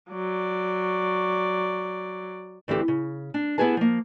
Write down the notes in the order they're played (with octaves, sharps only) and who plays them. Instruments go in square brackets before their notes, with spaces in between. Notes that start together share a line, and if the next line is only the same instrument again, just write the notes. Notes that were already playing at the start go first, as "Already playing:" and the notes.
[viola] F#3 D5
[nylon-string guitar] D2 E3 C4 G4 A4
C#3
D4
B3 E4 G4 G#4 B4 A5
F3 A#3